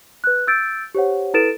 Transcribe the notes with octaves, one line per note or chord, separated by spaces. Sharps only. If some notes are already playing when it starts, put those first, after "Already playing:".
B4 F#6
E6 G6 A6 D7
G4 C5 C#5 F#5
E4 A4 B4 A6 D7 E7